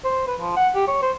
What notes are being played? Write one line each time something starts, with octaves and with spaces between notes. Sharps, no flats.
C5
B4
F3
F#5
G4
C#5
C5